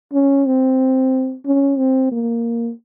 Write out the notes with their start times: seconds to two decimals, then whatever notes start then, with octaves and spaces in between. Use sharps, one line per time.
0.14 C#4
0.46 C4
1.46 C#4
1.78 C4
2.12 A#3